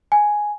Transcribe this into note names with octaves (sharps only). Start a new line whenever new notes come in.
G#5